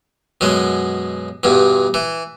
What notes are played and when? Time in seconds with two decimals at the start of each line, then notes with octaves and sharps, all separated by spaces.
0.41 F#2 B2 G#3
1.43 E2 G2 B2
1.94 E3